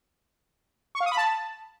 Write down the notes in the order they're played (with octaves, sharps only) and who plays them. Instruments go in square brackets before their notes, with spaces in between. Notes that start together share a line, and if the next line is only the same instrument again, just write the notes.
[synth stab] C#6
F5
D#6
B5
A5